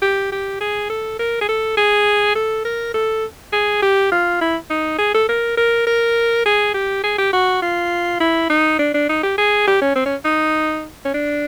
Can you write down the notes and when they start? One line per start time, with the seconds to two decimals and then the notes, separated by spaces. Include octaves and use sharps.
0.02 G4
0.32 G4
0.61 G#4
0.90 A4
1.19 A#4
1.41 G#4
1.49 A4
1.77 G#4
2.36 A4
2.65 A#4
2.94 A4
3.53 G#4
3.83 G4
4.12 F4
4.41 E4
4.70 D#4
4.99 G#4
5.14 A4
5.29 A#4
5.58 A#4
5.87 A#4
6.46 G#4
6.74 G4
7.04 G#4
7.18 G4
7.33 F#4
7.62 F4
8.20 E4
8.50 D#4
8.79 D4
8.94 D4
9.09 D#4
9.23 G4
9.38 G#4
9.68 G4
9.81 C#4
9.96 C4
10.06 C#4
10.25 D#4
11.05 C#4
11.14 D4